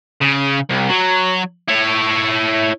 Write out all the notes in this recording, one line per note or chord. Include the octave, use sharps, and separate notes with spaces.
C#3
C2
F#3
E4 C#5